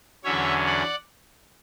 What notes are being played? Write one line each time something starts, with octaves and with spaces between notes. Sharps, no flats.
E2 D3 F#3 C#4 C#5 E5
D5 F#5